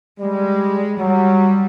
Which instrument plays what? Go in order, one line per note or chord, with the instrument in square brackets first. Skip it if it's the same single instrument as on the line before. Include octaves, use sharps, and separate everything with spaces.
[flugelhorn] G3 [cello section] G#3
[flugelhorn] F#3 [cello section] G3